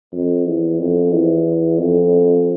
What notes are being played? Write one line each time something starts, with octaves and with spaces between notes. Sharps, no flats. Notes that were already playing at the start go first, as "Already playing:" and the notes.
F2
E2
F2
E2
F2